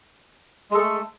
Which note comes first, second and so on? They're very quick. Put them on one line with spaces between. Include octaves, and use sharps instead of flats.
G#3 A4 A3